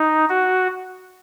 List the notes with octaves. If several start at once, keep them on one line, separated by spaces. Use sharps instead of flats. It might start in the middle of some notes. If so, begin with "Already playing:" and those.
Already playing: D#4
F#4